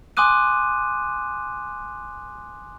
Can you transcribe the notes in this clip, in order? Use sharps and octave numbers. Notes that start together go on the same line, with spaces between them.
G#5 C6 D6 D#6 F#6 D#7